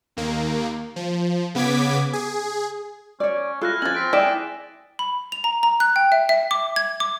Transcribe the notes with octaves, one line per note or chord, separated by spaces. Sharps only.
D#2 A#3
F3
C#3 B3 D6 G#6 B6
G#4
C#4 C#5 D5
E4 F4 A4 F6 F#6 A#6
F3 C#4 G#5 A6 F#7
C4 F6 B6 D7
E4 G#4 D5 G5 G#5 E6 B6 E7
B5
F7
A#5
A#5
F#6
G5
E5
E5
D6
G#6
D6